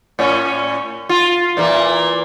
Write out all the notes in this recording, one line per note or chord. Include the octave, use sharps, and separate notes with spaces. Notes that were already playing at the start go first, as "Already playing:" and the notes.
A2 C#4
F4
A#2 E3 A#3